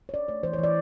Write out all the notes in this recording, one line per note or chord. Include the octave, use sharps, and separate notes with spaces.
C#5
C#4 D5
A3 C#5
E3 C5
C#5
E3 D5